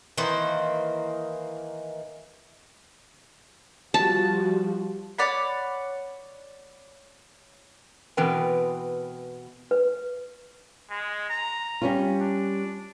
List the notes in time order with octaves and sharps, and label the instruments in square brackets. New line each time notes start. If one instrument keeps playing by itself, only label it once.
[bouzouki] D#3 E3 A#3 C5
[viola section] F3 G3 F#4 [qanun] A5
[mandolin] C#5 D5 F#5 B5
[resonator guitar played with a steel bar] B2 E3 C4 A#4 B4 G5
[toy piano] B4
[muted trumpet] G#3
A#5
[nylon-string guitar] G3 C#4 F4
[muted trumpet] D4